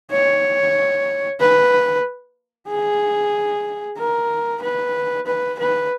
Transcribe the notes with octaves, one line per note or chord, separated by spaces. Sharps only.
C#5
B4
G#4
A#4
B4
B4
B4